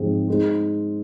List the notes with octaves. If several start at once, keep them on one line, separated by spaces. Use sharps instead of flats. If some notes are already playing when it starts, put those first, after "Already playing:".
Already playing: G#2 F3 C4 G#4
G#3 D#4 C5